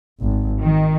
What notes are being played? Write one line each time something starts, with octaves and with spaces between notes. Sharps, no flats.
G#1
D#3